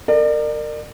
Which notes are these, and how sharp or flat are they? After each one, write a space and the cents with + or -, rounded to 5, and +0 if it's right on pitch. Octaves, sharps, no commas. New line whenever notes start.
A#4 -25 D5 +35